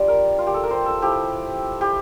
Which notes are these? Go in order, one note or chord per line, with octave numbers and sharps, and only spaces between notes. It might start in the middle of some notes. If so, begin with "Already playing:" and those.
Already playing: G3 D4 F4 G4
A#4
F4
G4
A4
A#4
C5
A4
F3 A3 E4 G4
G4